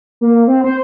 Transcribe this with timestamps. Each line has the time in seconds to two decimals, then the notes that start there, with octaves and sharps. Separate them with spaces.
0.21 A#3
0.47 C4
0.64 C5